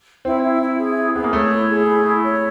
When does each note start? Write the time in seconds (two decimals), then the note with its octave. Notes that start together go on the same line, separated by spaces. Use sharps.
0.25 C4 E4
0.43 E4
0.61 E4
0.79 G#4
0.97 E4
1.15 B3 G#4
1.24 A#3
1.33 A3 C#5
1.52 E4
1.69 G#4
1.87 E4
2.05 E4
2.22 C#5